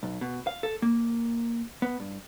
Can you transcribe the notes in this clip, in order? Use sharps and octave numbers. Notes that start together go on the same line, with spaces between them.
B1
B2
F5
A4
A#3
B3
G2